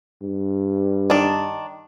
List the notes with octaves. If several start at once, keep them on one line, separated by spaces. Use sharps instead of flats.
G2
D#3 D4